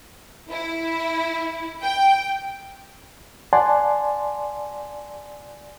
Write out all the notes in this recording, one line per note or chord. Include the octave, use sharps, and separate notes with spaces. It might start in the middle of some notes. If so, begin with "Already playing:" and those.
E4
G5
D5 F#5 G#5 A5 C6